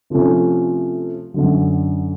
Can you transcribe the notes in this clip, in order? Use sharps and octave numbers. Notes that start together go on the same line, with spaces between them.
C3 F3 A3 C#4
F#2 D3 F#3